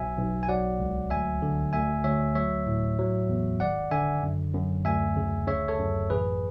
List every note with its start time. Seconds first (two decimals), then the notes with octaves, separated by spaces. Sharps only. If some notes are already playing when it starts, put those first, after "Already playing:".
Already playing: B1 F#3 E5 G#5
0.17 B1
0.43 G#5
0.49 F#3 D5 F#5
0.79 C#2
1.10 D2 E5 G#5
1.42 D3
1.73 D2 E5 G#5
2.04 D2 C#5 E5
2.35 F#3 C#5 E5
2.67 A2
2.99 F#3
3.29 E2
3.60 G#1 D5 F#5
3.91 D3 E5 G#5
4.22 F#2
4.54 F#2
4.85 D2 E5 G#5
5.16 C#3
5.47 C#3 C#5 E5
5.68 A4 C#5
5.79 F#2
6.10 A1 G#4 B4